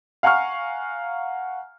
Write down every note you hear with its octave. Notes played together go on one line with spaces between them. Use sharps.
F5 F#5 G#5 A#5 C#6 F6